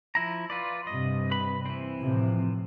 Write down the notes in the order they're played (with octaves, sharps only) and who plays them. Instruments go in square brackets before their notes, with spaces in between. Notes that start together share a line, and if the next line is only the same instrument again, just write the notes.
[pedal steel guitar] F3 E4 A#5
F4 B4 D5
[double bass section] G2 C3 [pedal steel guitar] D#5
[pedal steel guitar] B4 B5
E3 C4
[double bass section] A2 C3 F3